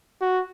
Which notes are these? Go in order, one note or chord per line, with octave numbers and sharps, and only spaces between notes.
F#4